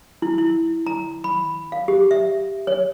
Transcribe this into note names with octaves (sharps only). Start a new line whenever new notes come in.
E4
E4
A#5
B5
F5
G4
E5
C#5